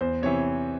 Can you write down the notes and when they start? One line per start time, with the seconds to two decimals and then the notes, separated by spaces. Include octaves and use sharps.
0.01 E2 C5
0.22 C3 E3 C#5